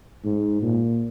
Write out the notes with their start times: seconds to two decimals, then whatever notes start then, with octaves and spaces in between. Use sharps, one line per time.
0.25 G#2
0.62 A#2